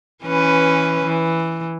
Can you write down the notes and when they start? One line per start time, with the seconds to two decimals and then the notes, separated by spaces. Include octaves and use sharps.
0.24 E3 C#4 B4
1.05 E3